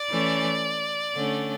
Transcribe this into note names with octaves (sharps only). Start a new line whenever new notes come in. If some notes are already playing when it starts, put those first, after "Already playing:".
Already playing: D5
E3 A3 C#4
D3 A3 C#4